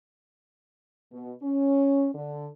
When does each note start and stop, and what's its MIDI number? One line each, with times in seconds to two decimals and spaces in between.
1.12 1.31 47
1.42 2.08 61
2.14 2.47 50